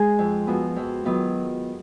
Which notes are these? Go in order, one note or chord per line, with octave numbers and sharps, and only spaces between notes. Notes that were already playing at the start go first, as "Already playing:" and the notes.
Already playing: G#3 D#4 G#4
F2
F3 B3 F#4
F2
D#3 F#3 B3 F4